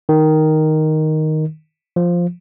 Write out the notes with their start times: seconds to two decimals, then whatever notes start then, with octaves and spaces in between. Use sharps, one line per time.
0.09 D#3
1.96 F3